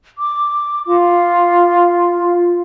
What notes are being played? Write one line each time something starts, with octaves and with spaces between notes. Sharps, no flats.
D6
F4